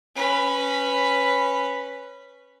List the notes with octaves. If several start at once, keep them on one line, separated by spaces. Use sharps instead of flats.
C#4 B4